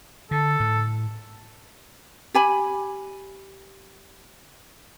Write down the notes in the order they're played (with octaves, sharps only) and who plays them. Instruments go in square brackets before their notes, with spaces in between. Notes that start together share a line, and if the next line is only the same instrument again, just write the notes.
[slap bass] D3 [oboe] A4
[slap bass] A2
[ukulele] G4 G#5 B5